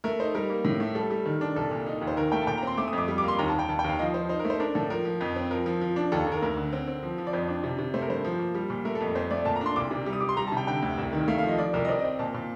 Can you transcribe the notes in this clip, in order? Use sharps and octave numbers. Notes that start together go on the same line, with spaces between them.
A3 A#4
D#4 C5
G3 A#4
A#3
A2
A3
G3 A4
G3
D#3
D4
C2 A4
A#2
D#4
D#2
C5
D#3 A#4
A3 G5
A5
A#2 G5
A#5
C4 C6
A3 D6
D#6
F2
D6
G3
D6
A#3
C6
D#2 A#5
A5
D#2
G5
D#2 A5
G5
D#2 F5
F3 D#5
F3 C5
D#4 C5
A#4
A3
C5
D4 A#4
A2 A4
F3 A#4
F3
F2
C4
F3 A#4
F3
F3
D4
D#2 A4
D#2
A#4
D2 A#4
D3
C4
C4
F3
F3
D5
F2 C5
D4
C3
C3
A3 C5
A#4
G2 C5
F3
A#3
G3
A#2
A3 A#4
A4
F2
F2 C5
A3 D5
A#2 A5
A#5
D4 C6
C2 D6
C3
G3
D#6
G3 D6
C6
G3 A#5
A5
C3 G5
D3 G5
D2
C2
D#3
A3 F5
F5
F3
D#5
F3 D5
C2 A#4
D#5
C4 D5
D#5
C4
A#2 A5
A#2